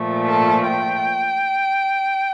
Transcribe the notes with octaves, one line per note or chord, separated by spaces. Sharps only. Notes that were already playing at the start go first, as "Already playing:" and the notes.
Already playing: A#2 F3 A3
A4
G5